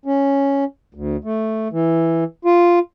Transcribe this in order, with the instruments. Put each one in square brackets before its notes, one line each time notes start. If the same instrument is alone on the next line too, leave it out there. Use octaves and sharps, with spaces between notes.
[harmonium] C#4
D2
A3
E3
F4